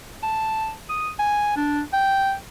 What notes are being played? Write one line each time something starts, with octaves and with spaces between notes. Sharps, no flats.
A5
D#6
G#5
D4
G5